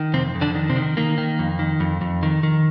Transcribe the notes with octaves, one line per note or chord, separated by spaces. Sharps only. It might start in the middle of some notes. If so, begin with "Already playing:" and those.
Already playing: D#3
F2 C3 C4
F2
D3 D4
D#3
C3 C4
D#3
D#3 A#3
D#3
F2
D#3
F2
F2
D#3
D#3